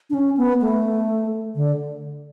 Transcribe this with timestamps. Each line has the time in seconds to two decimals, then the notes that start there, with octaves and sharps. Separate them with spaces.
0.10 D4
0.14 C#4
0.37 B3
0.61 A3
1.55 D3